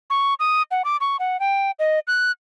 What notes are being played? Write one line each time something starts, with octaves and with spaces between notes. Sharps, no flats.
C#6
D#6
F#5
D6
C#6
F#5
G5
D#5
F#6